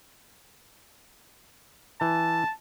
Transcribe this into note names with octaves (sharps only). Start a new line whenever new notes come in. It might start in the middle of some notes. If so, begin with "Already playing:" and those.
E3 A5